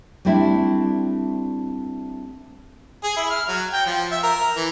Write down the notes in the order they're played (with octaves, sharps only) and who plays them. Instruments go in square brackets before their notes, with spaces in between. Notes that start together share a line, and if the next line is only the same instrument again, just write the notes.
[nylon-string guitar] G3 A3 C4 D4 E4
[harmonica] G#4
E4
F6
F#3
G5
F3
E5
A#4
E3